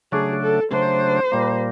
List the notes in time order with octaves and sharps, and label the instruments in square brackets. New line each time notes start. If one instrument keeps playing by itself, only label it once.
[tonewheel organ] C#3 F#3 A3 D4 [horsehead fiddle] G#4
[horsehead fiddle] A4
[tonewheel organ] C#3 F#3 A3 D4 [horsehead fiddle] C5
[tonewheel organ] A#2 G3 A#3